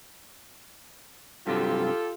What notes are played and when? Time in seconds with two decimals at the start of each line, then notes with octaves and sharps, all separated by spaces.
1.47 G2 C3 F#3 F4 G4 A4